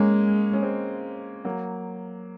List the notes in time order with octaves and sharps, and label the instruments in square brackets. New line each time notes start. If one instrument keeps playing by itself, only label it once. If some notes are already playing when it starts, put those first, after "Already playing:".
Already playing: [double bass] G#3 [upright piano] A#3 C#4
[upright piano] C#4
G#3 C4
F#3 A#3